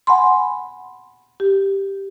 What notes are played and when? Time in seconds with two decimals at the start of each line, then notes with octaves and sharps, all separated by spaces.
0.07 F#5 G#5 B5 C6
1.40 G4